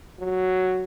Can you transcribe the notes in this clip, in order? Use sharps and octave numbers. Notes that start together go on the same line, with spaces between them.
F#3